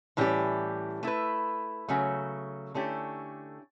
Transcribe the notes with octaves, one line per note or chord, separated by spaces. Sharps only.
A2 E3 G3 C#4 G4
A3 E4 B4
C#3 F#3 A3
D3 A3 C#4 E4 G4